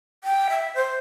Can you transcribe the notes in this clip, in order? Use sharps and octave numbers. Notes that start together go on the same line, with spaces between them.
G5
E5
C5